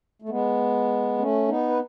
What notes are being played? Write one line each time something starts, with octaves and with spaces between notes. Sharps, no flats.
A3
G#3 B3
A3 C#4
B3 D#4
B4